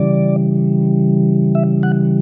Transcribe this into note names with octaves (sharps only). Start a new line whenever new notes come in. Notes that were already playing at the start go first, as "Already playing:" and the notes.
Already playing: C#3 E3 G3 D5
E5
F#5